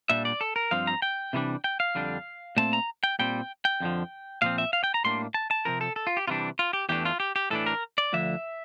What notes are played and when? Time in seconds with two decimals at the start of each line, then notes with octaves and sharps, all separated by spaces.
0.09 A#2 G3 D4 E5
0.25 D5
0.41 A4
0.56 A#4
0.71 G2 F3 C4 F5
0.87 A#5
1.02 G5
1.33 C3 E3 G3 A#3 D4
1.64 G5
1.80 F5
1.95 F2 D3 G3 D4
2.57 A#2 A3 C4 A5
2.73 A#5
3.04 G5
3.19 A#2 G3 C4 G5
3.65 G5
3.80 F2 D3 F3
4.42 A#2 F3 C4 F5
4.58 E5
4.73 F5
4.84 G5
4.94 A#5
5.04 A2 G3 A#3 D4 C6
5.34 A5
5.51 A5
5.65 C3 F3 C4 A#4
5.81 A4
5.96 A4
6.07 F4
6.17 G4
6.28 C3 E3 G3 D4 F4
6.59 F4
6.73 G4
6.89 E2 E3 A3 D4 G4
7.05 F4
7.20 G4
7.36 G4
7.50 A2 E3 A3 D4 A4
7.66 A#4
7.98 D5
8.13 D2 D3 F3 E5